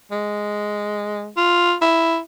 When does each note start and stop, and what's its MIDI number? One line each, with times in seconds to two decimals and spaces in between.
0.11 1.28 56
1.37 1.74 65
1.81 2.18 64